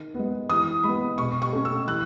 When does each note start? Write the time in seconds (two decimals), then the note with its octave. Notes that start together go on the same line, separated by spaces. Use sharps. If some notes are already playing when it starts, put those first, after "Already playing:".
Already playing: D#3
0.14 G#3 B3
0.49 E3 D#6
0.83 G#3 B3 B5
1.18 B2 C#6
1.42 C#6
1.52 A3 C#4
1.65 E6
1.87 E3 F#6